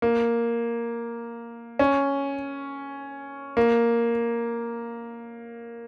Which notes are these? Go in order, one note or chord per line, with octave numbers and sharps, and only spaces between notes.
A#3
C#4
A#3